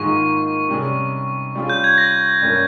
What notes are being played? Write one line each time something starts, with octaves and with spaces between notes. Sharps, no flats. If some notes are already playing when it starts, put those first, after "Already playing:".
Already playing: G#2 D#3 A#3 F4 G#4 C#6
C3 G3 C#4 G#4
G3 C#4 F4 G#4
G6
G#6
A#6
G2 G3 A#3 C#4